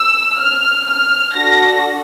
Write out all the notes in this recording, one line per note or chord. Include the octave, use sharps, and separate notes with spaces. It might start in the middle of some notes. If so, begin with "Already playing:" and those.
Already playing: E6
F6
F6
D4 F#4 A4 A#6